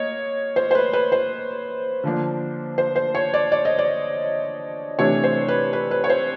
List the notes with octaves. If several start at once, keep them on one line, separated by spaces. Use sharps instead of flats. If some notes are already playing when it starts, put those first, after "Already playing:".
Already playing: A#3 C#5 D#5
C5
C5
B4
B4
C5
D3 F3 A#3 D4
C5
C5
C#5
D5
D5
D#5
D5
C3 E3 A3 D4 C#5
C5
B4
B4
B4
C#5
C5